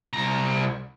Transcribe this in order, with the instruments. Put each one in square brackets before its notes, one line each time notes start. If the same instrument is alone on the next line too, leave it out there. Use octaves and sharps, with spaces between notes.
[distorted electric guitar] C2 A#5